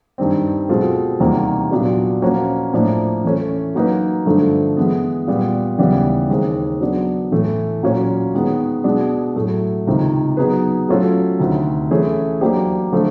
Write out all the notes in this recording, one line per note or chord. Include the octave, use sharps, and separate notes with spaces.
G2 D#3 G3 C4
B2 G#3 C4 F4 A4
E2 C3 D#3 G3 A#3
A#2 F#3 B3 D4 G4
A#2 F3 A#3 C#4 F#4
A2 F3 A#3 D4
E3 A3 C#4
F#3 A#3 D#4 F#4 B4
G2 D3 F3 A3
E3 G#3 B3
A#2 G3 B3
D#2 C#3 E3 G3 B3
D#2 D#3 G#3 C4
F#3 B3 D4
A2 E3 A3
A#2 F#3 A#3 C#4 F#4
D#3 G#3 B3
B2 G#3 B3 D4
A2 F#3 A3
C#2 C3 D#3
F#3 B3 D#4 G#4 B4
F#3 A3 C#4 F4 A4
D2 C3 D#3
E3 A3 C#4 E4 G#4
F#3 A#3 D4 G4 C5
D3 F3 A3